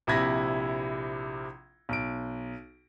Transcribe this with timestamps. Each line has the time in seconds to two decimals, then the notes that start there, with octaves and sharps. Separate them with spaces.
0.07 A#1 C3 E4 B5 G#6 A#6
1.89 B1 D7